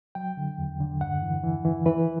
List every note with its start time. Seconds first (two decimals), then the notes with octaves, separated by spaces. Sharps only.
0.15 F#3 G5
0.37 D3
0.58 E2
0.80 D3
1.01 G2 F#5
1.22 E3
1.43 E3
1.65 E3
1.86 E3 B4